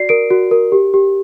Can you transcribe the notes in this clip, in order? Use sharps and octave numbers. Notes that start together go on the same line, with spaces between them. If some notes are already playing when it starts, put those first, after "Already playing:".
Already playing: F#4 D5 C7
A#4 D7
F#4
A#4
G4
G4